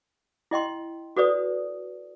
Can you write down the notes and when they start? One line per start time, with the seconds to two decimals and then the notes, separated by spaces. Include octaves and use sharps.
0.51 E4 D#5 G5 C6
1.17 F#4 A4 B4 D5 D#6